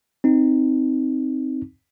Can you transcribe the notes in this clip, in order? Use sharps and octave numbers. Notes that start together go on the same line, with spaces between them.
C4 D#4